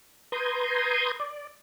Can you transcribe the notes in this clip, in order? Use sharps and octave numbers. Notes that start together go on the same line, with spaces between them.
B4 A#5 C6 D#6 G6 G#6
D5